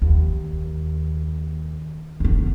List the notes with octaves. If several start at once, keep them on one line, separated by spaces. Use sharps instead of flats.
D#2
D3 B3